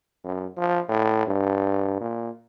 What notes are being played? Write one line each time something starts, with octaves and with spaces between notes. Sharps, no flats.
F#2
F3
A2
G2
A#2